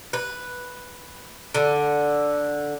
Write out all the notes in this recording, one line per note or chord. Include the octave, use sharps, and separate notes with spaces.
B4
D3